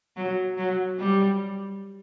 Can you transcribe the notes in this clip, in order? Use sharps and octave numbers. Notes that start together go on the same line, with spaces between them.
F#3
F#3
G3